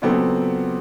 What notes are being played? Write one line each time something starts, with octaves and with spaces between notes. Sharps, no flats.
A#2 C#3 F#3 B3 C4 A4